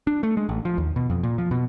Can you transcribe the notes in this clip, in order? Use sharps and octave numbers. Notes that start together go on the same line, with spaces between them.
D4
A3
G#3
A1
F3
D#2
B2
F2
A#2
F3
B2